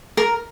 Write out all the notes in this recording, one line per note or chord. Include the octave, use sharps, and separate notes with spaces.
A#4